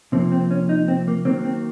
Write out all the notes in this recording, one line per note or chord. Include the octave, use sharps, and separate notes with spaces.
C3 F3 A#3 C4
C4
C#4
D#4
C4
A#3
D#3 F#3 A#3 C4
C4